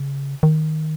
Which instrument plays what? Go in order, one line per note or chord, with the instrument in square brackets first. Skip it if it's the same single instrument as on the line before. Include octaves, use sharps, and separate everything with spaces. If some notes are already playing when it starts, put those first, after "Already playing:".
Already playing: [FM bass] C#3
D#3